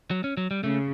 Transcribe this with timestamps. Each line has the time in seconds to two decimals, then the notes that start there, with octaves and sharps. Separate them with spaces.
0.11 F#3
0.24 C#4
0.37 F#3
0.51 G3
0.64 C#3 A3